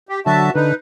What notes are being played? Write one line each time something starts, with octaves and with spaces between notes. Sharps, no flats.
G4
D3 F#3 F#4 E5 A5
D3 D#4 B4